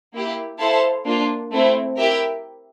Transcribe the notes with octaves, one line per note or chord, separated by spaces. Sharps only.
A#3 E4 G4
E4 A4 C5 F5 A5
A#3 D4 F4
A3 C4 E4
E4 G4 A#4 E5